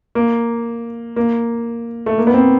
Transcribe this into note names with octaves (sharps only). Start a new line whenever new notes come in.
A#3
A#3
A3
A#3
B3
C4